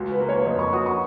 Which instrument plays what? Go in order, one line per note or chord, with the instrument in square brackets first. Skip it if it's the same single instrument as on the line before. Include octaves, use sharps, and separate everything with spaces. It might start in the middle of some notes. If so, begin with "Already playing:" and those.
Already playing: [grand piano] C#2 [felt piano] F#4
[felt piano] B4
[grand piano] A#3
[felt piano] C#5
[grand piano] F2 [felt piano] D#5
[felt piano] C#6
[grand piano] F#4 [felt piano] D#6
[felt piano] C#6